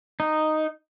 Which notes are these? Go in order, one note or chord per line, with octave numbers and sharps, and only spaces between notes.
D#4